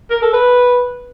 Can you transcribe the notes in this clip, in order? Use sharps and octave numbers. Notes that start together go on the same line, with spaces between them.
A#4
A4
B4